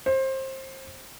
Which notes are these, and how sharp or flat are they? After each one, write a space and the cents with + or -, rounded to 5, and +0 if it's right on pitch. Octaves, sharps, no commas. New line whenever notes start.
C5 +25